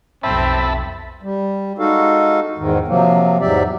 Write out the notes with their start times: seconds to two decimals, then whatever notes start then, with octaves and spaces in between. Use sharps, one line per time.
0.23 F1 B1 C4 E5 A5 B5
1.22 G3
1.79 G#3 D#4 F#4 A4 F5
2.58 E2 G#2 D#3
2.88 C3 F3 F#3 A#3
3.41 E2 G#2 F#3 G4 D5 E5